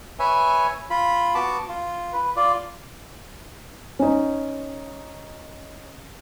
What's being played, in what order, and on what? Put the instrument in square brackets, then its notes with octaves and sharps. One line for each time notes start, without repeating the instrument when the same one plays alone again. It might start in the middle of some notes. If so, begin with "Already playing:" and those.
[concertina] B4 C#5 E5 G#5
F4 B5
B3 F#4 A5 D6
F4
B4
F4 D5
[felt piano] C#4 D#4